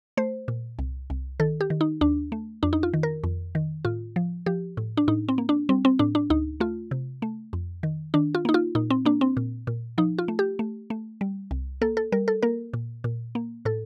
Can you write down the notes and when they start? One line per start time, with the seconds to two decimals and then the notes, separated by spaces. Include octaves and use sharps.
0.17 A3 C5
0.48 A#2
0.79 C2
1.10 C2
1.40 D#3 A4
1.61 G4
1.70 D#3
1.81 D#4
2.01 D#2 D4
2.32 A3
2.63 F2 D4
2.73 D#4
2.83 F4
2.94 D#3
3.03 A#4
3.24 F2
3.55 D#3
3.85 A2 F4
4.16 F3
4.46 F3 G4
4.77 A2
4.97 D4
5.08 A2 D#4
5.29 C4
5.38 A#3
5.49 D4
5.69 G3 C4
5.85 C4
5.99 A2 D4
6.15 D4
6.30 D2 D#4
6.60 A3 F4
6.91 C3
7.22 A3
7.53 F2
7.83 D#3
8.14 D#3 D4
8.35 F4
8.45 A#3 D#4
8.54 F4
8.75 A#2 D#4
8.90 C4
9.05 A#3 D4
9.21 C4
9.37 A#2
9.67 A#2
9.98 F3 D#4
10.18 F4
10.28 A3
10.39 G4
10.59 A3
10.90 A3
11.21 G3
11.51 C2
11.81 A#3 A4
11.97 A4
12.12 G3 A#4
12.28 A4
12.42 A#3 A#4
12.74 A#2
13.04 A#2
13.35 A#3
13.65 A2 A4